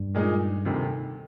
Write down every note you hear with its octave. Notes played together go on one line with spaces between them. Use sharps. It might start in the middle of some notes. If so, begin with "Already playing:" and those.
Already playing: G2
A#2 G#3 D#4
D2 C3 D#3